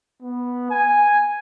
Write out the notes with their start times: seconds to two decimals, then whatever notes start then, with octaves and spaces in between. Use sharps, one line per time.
0.22 B3
0.70 G#5